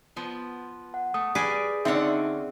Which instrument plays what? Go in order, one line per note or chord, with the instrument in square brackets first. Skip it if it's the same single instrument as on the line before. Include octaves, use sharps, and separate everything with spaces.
[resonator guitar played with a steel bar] F3 B3
[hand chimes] F#5
[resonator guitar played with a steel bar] A3 [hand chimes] D#6
[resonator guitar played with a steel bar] G3 [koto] G#4 B4 D5
[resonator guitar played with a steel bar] D3 C#4 D5 [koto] C4 F#5 [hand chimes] D#4 E5